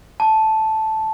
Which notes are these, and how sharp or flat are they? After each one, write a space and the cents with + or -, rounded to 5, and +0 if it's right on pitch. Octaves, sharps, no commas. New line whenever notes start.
A5 -5